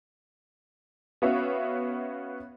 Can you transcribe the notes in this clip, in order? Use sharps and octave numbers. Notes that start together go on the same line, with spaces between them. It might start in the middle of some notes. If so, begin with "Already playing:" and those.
B3 C#4 F#4 C#5 E5 F5